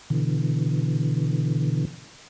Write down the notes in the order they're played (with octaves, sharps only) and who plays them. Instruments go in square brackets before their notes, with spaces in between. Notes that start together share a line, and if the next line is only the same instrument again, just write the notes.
[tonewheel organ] B2 D3 E3